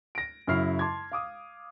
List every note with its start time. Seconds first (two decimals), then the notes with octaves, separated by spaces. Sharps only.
0.15 A#6 D7
0.47 F#2 C#3 F#3 E4 F6 C7
0.79 A5 C6 D6 G#6
1.12 F5 D6 D#6